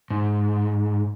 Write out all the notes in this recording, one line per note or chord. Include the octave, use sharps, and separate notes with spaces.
G#2